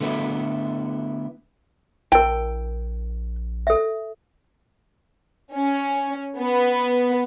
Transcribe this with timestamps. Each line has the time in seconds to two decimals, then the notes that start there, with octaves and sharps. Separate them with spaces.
0.01 D3 A3 B3 E4
2.12 A#1 E4 A#4 G5
3.67 A4 E5
5.53 C#4
6.39 B3